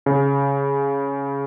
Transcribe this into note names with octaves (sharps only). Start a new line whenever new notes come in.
C#3